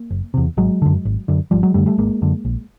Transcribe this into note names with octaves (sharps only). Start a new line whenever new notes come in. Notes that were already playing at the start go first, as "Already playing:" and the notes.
Already playing: A#3
F#1
E2 C3
G#1 F#3 G#3
F#2 D3
G#1
F#2 D3
G#1 F3 G3
F#3 G#3
F#2 D3 G3 A3
G3 A3
G#1 G#3 A#3
F#2 D3
A#1